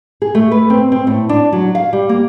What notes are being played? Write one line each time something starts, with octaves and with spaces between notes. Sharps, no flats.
G#4
A3
B4
C4
C4
A2
D4
F#3
F5
G3
A#3